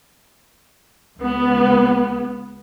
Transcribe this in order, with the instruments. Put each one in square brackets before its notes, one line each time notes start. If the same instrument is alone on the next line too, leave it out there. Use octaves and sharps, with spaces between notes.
[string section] C#2 B3